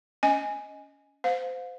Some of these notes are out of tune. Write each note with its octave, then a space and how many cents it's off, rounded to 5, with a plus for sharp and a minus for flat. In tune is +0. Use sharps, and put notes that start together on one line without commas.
C#4 +25 D#5 +0 G#5 +0
C5 -25 F5 +30